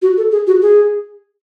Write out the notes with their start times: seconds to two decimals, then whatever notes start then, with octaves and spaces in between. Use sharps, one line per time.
0.02 F#4
0.17 A4
0.31 G#4
0.47 F#4
0.62 G#4